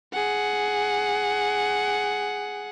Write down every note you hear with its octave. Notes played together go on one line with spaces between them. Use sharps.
G#4 F#5